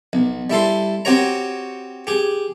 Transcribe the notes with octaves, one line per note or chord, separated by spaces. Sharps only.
B1
G3 E4 A4 C6
C4 F#4 G4 C#5 A#5
G4 G#4